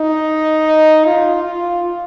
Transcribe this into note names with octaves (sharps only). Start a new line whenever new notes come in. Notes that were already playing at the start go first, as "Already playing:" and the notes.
Already playing: D#4
F4
F4